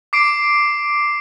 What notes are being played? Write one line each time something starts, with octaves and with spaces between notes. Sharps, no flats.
D6 C7 D7